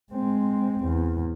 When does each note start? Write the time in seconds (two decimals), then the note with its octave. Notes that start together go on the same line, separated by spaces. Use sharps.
0.13 G#3 C4
0.85 E2